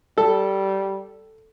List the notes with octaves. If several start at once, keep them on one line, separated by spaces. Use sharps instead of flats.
G3 A4